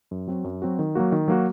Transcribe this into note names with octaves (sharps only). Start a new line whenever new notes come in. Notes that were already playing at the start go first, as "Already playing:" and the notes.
F#2
F#3 C4 F#4
F#2
F#3 C4 F#4
D#3
F#3 A#3 F#4
D#3
F#3 A#3 F#4